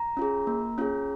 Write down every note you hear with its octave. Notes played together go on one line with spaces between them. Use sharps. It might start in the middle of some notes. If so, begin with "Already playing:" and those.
Already playing: A#5
C#4 F4 G#4
A#3
C#4 F4 G#4